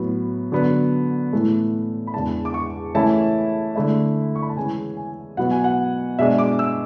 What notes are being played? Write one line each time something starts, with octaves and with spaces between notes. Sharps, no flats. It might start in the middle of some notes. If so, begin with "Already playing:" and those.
Already playing: A2 F#3 B3
D3 F#3 B3
A2 E3 A3
B5
E2 C#3 G#3 D4 A5
D6
C#6
C#3 E3 A3 C#4 E4 A5
D3 A3 E4
C#6
B5
A5
C#3 E3 G#3 C#4 G#5
G#5
B2 F#3 B3 F#5
G#5
F#5
B2 G#3 D4 E5
D6
E6